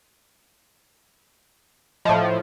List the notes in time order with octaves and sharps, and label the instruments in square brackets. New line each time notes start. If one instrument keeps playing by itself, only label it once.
[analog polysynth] A2 F3 [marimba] D#5 E5 A5